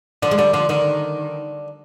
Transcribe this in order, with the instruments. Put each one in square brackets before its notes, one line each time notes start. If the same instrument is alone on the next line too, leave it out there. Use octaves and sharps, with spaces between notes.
[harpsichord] D3 [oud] F3
[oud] G#3
[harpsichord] D3 [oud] G3
[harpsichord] D3 [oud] F3
[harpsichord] D3 [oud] D#3